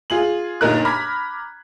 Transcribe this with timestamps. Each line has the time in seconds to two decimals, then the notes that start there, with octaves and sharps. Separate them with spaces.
0.10 F4 G#4 F#7
0.61 G1 A#2 D#4 A#4 F#6
0.85 A#5 B5 D6 F6 G#6 B6